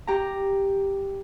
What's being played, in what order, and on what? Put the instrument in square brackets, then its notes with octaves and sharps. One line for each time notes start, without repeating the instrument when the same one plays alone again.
[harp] G4 A#5